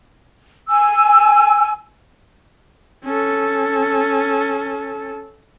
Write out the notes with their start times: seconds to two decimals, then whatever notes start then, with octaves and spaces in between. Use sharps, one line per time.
0.70 G#5 E6
3.04 C#4 A4